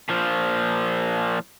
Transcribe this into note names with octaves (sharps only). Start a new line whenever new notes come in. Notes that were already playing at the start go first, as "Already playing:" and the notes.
A#2 F3